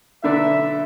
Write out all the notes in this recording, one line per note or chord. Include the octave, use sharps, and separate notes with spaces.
B1 D3 D5 E5